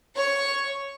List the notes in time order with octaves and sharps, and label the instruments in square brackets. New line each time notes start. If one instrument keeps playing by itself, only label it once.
[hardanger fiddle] C#5 C#6